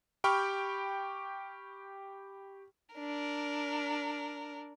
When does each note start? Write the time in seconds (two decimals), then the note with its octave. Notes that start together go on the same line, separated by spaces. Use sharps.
0.24 G4 G5 B5 C#6 F6
2.95 D4 A#4